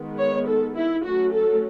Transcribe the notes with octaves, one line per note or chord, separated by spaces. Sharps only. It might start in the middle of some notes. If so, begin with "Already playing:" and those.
Already playing: D#3 G#3 B3
C#5
A4
E4
F#3 A3 C#4 F#4
A4